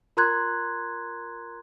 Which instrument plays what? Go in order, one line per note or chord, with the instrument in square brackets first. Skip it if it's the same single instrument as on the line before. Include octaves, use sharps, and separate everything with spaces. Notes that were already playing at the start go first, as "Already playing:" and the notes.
[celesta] F4 A#4 A#5 C6 F#6 G#6